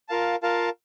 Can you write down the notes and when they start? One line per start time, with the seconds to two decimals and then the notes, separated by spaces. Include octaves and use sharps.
0.09 F4 A#4 F5 A5
0.43 F4 A#4 F5 A5